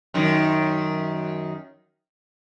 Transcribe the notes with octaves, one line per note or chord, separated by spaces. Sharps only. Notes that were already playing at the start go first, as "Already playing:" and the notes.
F#2 D#3